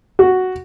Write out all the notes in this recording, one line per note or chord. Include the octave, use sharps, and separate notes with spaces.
F#4